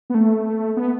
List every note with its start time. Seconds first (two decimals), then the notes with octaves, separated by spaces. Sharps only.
0.10 B3
0.14 A3
0.77 B3